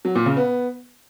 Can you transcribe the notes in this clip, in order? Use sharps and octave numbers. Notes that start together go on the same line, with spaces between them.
F#3
A#2
C#3
B3